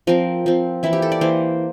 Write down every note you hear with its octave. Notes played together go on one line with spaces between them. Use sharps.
F3 C4 A#4
F3 C4
E3 A#3 E4
G4
A4
D5
E3 A#3 C5